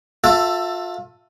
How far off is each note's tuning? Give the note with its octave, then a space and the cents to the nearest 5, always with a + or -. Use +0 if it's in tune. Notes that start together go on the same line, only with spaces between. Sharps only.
F4 +35 A4 +15 E5 +0